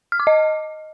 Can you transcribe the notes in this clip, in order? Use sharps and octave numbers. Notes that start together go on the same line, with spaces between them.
F6
D6
D#5